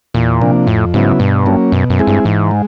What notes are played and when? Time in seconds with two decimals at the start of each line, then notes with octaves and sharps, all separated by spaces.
0.14 E2 A#2
0.41 C3 F3 A#3 D4
0.67 F2 A2
0.94 G#2 C#3 F#3 B3 E4
1.19 G2 B2
1.46 F#3 A#3 C#4
1.72 F#2 B2
1.90 F#2
1.99 G#3 C4 E4 G#4
2.07 G2
2.25 G#2 E3
2.51 G#3